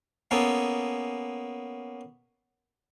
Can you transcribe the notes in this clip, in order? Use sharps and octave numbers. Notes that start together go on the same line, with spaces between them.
A#3 B3 C#4 G#4 A4